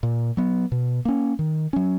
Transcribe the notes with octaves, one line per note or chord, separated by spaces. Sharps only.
A#2
F#3 B3
B2
A#3 C#4
D#3
F#3 C#4